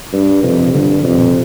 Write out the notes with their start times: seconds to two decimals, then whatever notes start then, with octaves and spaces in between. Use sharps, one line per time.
0.13 G2
0.43 F2 C3
0.67 C3
0.73 G2 D3
1.03 F2 C3
1.16 A#2
1.29 C3